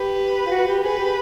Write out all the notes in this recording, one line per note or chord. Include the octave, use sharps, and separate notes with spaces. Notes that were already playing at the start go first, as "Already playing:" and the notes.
Already playing: G4 B4
F4
F#4
G4
G#4 B4
G4